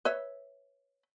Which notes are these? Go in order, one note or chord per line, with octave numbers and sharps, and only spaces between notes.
B4 C#5 E5